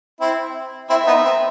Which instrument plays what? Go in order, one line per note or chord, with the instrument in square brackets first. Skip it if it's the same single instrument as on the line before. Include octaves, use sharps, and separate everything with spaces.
[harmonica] C4 E4
[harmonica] C4 E4 [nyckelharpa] E5
[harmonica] B3 D#4
C4